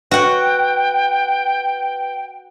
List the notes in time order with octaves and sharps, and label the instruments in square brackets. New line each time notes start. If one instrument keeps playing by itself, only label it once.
[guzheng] F#4 F#5 [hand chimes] B4 [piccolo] G5